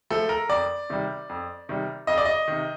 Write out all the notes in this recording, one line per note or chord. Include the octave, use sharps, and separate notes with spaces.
F3 A3 A4
A#4
F2 D5
C3 D#3 G3
F2
C3 D#3 G3
F2 D#5
D5
D#5
C3 D#3